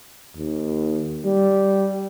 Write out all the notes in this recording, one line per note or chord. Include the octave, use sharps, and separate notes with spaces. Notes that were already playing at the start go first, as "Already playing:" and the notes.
D#2
G3